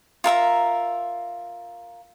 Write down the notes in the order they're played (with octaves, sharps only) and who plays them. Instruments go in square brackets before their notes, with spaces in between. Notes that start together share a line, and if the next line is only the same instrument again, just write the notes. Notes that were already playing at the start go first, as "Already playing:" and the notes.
[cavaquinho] F4 A#4 E5 A#5